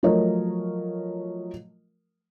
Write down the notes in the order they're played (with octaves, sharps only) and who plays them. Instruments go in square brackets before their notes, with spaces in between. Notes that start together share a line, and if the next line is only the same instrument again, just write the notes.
[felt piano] F3 F#3 A3 A#4 C#5 D#5